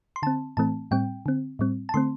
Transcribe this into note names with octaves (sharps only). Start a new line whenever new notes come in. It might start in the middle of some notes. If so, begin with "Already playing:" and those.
C6
D3 C4 A5
A2 E3 A3 C4 A5
A2 G3 C4 G5
D3 C4
A2 G3 C4
A5
D3 A3 C4 C6